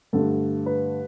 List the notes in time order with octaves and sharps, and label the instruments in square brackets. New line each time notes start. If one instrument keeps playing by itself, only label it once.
[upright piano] G2 D3 A3 A4
B4